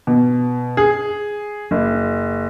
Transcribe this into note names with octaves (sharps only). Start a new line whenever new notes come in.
B2
G#4
F#1